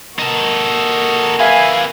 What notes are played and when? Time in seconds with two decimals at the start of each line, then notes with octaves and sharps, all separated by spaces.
0.19 A#3 D#4 F#4 A4
1.40 G#4 B4 E5 F5 G#5